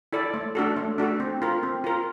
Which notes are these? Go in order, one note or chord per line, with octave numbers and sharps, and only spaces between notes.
E4 A4 D5
A3
D4 F#4 A4
A3
D4 F#4 A4
C4
F4 A#4
C4
F4 A#4